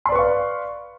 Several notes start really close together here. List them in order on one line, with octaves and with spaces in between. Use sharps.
C6 D5 B4 C#6 F5